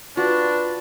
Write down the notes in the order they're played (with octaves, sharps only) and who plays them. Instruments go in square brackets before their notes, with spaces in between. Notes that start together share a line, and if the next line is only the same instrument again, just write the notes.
[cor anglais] D4 [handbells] F4 [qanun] F#4 [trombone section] B4